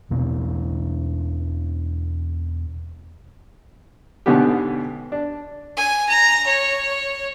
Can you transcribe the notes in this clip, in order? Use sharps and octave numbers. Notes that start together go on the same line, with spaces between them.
E2 B2 C4
G#2 B2 D3 B3 C#4 G4
D4
G#5
A#5
C#5